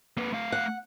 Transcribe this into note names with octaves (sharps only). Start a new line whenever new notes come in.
A#3 B4
A3 F5
F#5